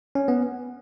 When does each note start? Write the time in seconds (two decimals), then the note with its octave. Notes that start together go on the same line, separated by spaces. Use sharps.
0.15 C#4
0.28 B3